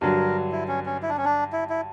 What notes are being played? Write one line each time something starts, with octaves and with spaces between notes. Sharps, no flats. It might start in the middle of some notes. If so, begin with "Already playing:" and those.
G2 D3 F#3 A#4
E4
C#4
C#4
E4
D4
C#4
D4
E4
E4